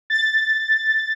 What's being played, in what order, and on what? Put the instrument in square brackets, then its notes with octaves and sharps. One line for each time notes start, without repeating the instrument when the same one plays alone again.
[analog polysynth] A6